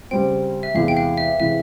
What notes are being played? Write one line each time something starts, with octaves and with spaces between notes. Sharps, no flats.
C#3 G3 C4 G5
E5
E2 C3 E3 G#3 E4 F5
G5
F5
E5
C3 E3 G#3 E4 E5